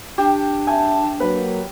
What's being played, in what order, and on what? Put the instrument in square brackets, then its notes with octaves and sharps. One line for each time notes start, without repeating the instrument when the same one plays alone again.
[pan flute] D4 [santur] G4
[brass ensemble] E5 A5 [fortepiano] G#5
[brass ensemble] F#3 A#3 [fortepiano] B4